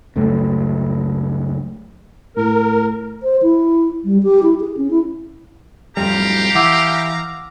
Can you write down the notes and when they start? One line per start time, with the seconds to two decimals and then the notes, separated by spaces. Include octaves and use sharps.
0.16 C#2 F#2 A3
2.36 A2 A#4
3.23 C5
3.42 E4
4.05 G3
4.23 G4
4.43 E4
4.60 G#4
4.77 C#4
4.91 E4
5.97 D1 F2 G3 G4 F5 A#5
6.55 E3 F#5 D6 E6